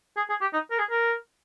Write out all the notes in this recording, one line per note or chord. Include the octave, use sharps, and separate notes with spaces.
G#4
G#4
G4
D#4
A#4
G#4
A#4